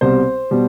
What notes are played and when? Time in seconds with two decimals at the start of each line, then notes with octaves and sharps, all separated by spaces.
0.01 C2 B2 G3 C5
0.51 B2 G3